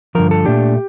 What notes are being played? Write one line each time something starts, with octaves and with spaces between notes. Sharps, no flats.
G2 D3 F3 A#4
A4
A#2 A3 D4 G4